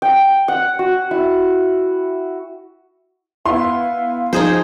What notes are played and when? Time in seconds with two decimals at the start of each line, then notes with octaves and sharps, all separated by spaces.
0.02 G5
0.48 F#5
0.79 F#4
1.11 E4
3.45 B3 E4 F5 C6
4.33 F3 D#4 G#4 C5